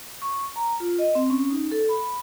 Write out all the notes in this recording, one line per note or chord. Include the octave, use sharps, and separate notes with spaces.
C#6
A#5
F4
D#5
C4
C#4
D#4
A4
B5